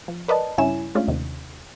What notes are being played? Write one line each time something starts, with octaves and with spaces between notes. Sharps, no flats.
F3
A#4 B4 D5 D#5 A5
G2 C#3 E4 C#5 G#5 E7
G#3 A3 C#4 D4 F4
D#2 C3 D#3